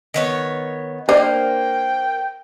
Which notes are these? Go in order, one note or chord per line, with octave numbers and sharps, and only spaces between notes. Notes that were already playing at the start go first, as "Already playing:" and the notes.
D#3 B3 C#5
A#3 D4 C5 D#5 G5